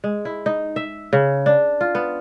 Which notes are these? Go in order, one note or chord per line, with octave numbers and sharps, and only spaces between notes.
G#3
E4
D#4
E5
C#3
D4
F4
B3